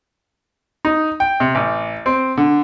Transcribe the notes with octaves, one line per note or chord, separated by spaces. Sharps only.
D#4
G5
C3
A1
C4
D3